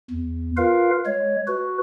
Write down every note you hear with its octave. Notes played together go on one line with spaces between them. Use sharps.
E2
F4 A#4 B4 F5
G#3 C#5
F#4 B4